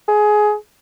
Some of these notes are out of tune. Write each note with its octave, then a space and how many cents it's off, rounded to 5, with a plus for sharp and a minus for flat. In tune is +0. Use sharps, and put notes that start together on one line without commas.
G#4 +15